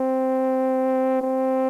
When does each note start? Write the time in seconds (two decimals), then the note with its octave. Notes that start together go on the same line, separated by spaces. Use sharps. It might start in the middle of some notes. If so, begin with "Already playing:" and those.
Already playing: C4
1.21 C4